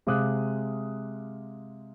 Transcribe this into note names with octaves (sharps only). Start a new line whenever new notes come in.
C3 G#3 F5 D6 D#6 F#6